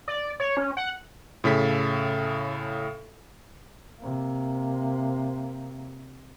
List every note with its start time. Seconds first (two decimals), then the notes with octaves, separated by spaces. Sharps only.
0.08 D5
0.40 C#5
0.57 C#4
0.77 F#5
1.44 A2 C#3 A4 B6
4.00 C3 A#3